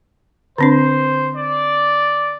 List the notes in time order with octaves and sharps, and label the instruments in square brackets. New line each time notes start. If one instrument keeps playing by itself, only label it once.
[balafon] D3 C4 D4 [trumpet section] C5
[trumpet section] D5